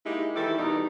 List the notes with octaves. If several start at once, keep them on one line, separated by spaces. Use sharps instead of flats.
G#3 A#3 D#4 E4 G4
D#3 E3 E4 G4 A4
B2 E3 G3 D#4